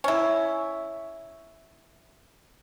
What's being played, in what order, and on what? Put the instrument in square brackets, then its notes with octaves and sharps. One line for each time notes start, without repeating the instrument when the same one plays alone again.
[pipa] C#4 E4